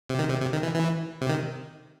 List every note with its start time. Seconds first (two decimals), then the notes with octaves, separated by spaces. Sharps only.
0.09 C3
0.19 D#3
0.30 C3
0.41 C3
0.52 D#3
0.63 E3
0.74 E3
1.21 C3
1.29 D#3